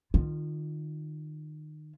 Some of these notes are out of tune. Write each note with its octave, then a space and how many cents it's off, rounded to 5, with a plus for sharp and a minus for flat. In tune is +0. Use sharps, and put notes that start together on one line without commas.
D#3 -30 F4 +0